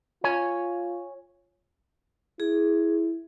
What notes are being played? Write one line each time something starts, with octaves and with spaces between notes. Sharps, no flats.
F4 C#5 G#5
E4 G#4